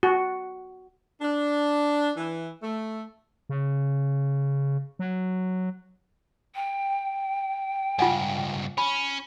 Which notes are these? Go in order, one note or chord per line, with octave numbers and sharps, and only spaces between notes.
F#4
D4
E3
A3
C#3
F#3
G5
C#2 G2 F4 F#5 G#5
C#4 B5